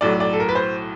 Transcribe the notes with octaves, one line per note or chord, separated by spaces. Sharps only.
B1 A2 F#3 D5
D5
A4
A#4
B4
C5